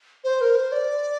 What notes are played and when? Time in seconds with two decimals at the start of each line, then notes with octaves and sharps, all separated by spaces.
0.24 C5
0.41 A#4
0.56 C5
0.72 D5